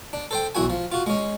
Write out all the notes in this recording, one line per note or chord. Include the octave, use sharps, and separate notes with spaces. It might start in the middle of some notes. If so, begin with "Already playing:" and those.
D4
A4 C5 G5
B1 E2 E4 F#4 G#5
F3
F4 F#4
G#3 C#4